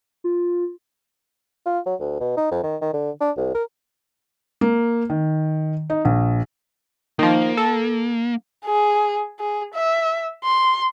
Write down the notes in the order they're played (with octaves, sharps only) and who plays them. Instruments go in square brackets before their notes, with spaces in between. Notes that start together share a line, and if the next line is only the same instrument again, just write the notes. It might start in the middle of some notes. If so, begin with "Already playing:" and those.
[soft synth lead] F4
[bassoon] F4
F#3
D2
B2
D#4
F2
D#3
D#3
D3
D4
C2
A#4
[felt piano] A#3
D#3
D#4
A#1
[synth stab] D#3 F3 [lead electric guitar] A#3
[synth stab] A4
[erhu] G#4
G#4
E5
C6